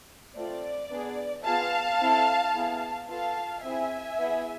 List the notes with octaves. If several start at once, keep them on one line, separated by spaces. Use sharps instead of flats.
A3 C4 F4 D5
B3 D4 G#4
B3 F4 G#4 F5 A5
C4 E4 A4
B3 E4 G#4
B3 F4 A4 F5 A5
C4 E4 G#4 E5 G#5
B3 E4 G#4